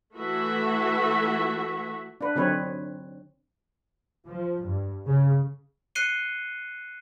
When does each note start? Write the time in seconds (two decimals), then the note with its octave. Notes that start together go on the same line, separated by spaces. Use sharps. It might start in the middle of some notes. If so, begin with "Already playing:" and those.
0.17 E3 A3 F#4 E5
2.21 D4 B4
2.36 D3 F#3 C4 D#4 B4 C#5
4.27 F3
4.65 G2
5.06 C#3
5.95 F#6 C7 C#7 D#7 G7